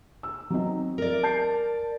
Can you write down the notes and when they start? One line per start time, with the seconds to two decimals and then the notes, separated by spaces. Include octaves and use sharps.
0.23 E6
0.50 F#3 C4 D#4
0.98 A#4 D5
1.23 A5 G6 C7